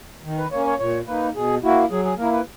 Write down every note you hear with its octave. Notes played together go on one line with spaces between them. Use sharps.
D#3
B4
A#3 C#4 C#5
C#5
A#2 C#5
A#3 D#4 B4
B2 G#4
A#3 E4 F#4
F#3 G#4
G#4
A#3 E4 A#4
B4